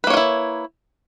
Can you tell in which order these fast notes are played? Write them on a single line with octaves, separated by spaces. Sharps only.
B4 A#3 C#5 F4 E4